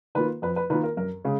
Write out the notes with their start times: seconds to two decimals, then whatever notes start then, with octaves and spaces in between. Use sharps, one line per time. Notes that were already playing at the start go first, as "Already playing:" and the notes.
0.15 D#3 A#3 F4 B4
0.42 F2 B4
0.56 B4
0.70 D#3 A#3 F4 B4
0.83 A#4
0.97 F#2 A#4
1.25 C#3 G#3 G#4